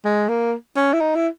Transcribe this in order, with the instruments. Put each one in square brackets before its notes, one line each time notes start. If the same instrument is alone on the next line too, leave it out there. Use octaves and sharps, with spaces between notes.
[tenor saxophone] G#3
A#3
C#4
E4
D#4
E4